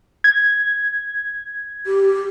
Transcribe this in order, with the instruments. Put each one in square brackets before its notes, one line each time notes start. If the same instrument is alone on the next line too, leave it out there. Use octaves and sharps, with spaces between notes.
[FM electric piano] G#6
[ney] G4